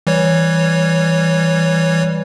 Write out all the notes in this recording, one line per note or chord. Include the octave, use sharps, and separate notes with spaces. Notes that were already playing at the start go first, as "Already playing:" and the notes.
E3 G3 C#5